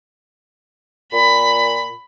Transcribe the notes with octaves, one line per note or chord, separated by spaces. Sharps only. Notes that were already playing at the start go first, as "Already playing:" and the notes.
A#2 B5